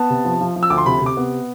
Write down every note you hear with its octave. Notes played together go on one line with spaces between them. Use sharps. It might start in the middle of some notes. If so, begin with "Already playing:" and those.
Already playing: B3 A5
C3
F3
F3
F3
E6
D2 D6
C6
C3 B5
C3
D6
B3